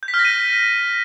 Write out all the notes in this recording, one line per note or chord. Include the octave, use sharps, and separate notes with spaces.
G6
B6
F6
A#6
D#7